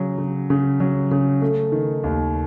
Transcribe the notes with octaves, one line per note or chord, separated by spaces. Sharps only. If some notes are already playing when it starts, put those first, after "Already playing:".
Already playing: C#3 F#3
C#3
C#3
F#3
C#3
A3
D#3
D#2